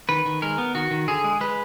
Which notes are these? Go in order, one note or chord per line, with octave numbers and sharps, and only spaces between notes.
D#3 B4
D#3
G#3 A#4
B3
D#3 F#4
D#3
D3 G#4
G#3
G#3 B4